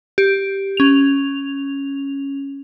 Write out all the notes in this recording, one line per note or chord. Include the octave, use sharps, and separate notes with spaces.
G4
C#4 F7